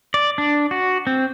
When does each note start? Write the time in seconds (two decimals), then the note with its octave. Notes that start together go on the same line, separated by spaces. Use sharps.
0.14 D5
0.38 D4
0.71 F#4
1.07 C4